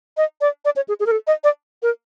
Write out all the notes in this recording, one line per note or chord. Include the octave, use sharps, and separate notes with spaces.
D#5
D5
D5
C#5
G#4
G#4
A#4
A4
D#5
D5
A#4